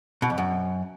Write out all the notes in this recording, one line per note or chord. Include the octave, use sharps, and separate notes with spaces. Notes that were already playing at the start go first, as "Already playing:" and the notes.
B2
F2
F#2